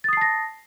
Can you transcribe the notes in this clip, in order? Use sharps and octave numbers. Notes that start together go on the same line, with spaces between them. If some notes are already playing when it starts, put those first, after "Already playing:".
A5 D#6 A6 A#6 C7